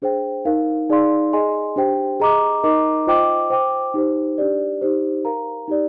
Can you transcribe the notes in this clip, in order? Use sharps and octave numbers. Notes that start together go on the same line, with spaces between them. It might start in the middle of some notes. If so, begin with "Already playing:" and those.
D4 G#4 C5 G5
D#4 A#4 F5
D#4 G#4 D5 F5 C6
G#4 D#5 G#5 C6
D4 G4 C5 G5
G#4 D#5 A#5 D6
D#4 A#4 D#5 A#5 D6
F4 C5 D#5 G5 D6
C5 G5 D6
D#4 G4 C5
D4 G4 D5
D#4 G4 C5
A#4 F5 A#5
D#4 G4 D5